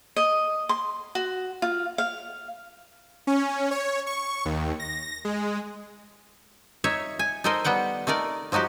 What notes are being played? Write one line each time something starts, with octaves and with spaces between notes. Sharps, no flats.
D#5
C6
F#4
F4
F5
C#4
C#5
C#6
D#2
A#6
G#3
D#4 C#5 E5
G#5
D#4 A4 A#4 C5 D#5
G3 B3 F#5 G5
A3 D#4 A#4 D5
F3 F#3 D#4 F#4 G4